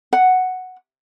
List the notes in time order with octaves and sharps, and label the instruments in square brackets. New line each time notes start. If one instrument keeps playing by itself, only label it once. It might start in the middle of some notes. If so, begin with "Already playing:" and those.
[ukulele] F#5